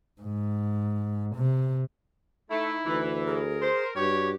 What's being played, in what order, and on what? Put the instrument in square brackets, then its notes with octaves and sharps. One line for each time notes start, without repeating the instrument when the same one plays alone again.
[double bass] G#2
C3
[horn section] A3 [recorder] D#4 [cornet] E4
[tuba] D2 [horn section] E3
[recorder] G#4 [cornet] A#4
[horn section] C5
[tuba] G2 [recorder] F#4 [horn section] G4 [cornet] C#5